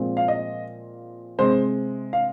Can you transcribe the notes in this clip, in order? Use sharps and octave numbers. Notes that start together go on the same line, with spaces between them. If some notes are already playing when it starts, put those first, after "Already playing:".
Already playing: A#2 F3 G#3 C4
F5
D#5
C3 G#3 C4 C5
F5